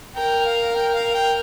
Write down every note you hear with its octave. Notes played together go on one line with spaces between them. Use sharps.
A#4 G5
F5
G5
F5
G5